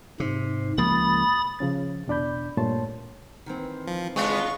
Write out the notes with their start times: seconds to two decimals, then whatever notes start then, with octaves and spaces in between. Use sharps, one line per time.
0.20 G#2 C3
0.78 C#2 F3 A#3 B5 D#6 A6
1.59 C#3 F3 C#4 A6
2.08 E2 B2 D4 D5 B5 G6
2.57 G2 A#2 A3 C#5 A5 C6
3.46 D#3 E3 C4
3.87 F3
4.16 C#3 G#3 B3 F4 C#6